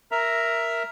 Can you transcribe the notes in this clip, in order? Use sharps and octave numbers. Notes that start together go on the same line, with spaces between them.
A#4 E5 A#5